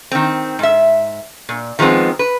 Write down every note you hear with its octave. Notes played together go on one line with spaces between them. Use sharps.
D#3 C4
G#2 E5
A#2
D#3 F3 G#3 B3 C4
B4